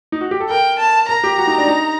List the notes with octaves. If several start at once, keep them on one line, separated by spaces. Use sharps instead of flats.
D#4
F#4
G4
A4
A#4 G5
A5
A#4 A#5
G4
F#4
D#4
D4
D#4